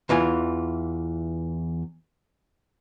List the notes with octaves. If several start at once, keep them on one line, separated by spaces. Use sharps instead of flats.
E2 E3 F4 G#5